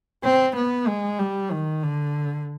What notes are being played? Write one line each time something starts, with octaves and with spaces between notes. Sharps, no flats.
C4
B3
G#3
G3
D#3
D3